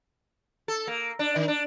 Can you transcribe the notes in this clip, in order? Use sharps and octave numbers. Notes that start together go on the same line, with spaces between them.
A4
A#3
D4
D#3
D4